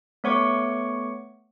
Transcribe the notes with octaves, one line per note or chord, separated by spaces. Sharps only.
A3 B3 C#5 F#5 C#6 D6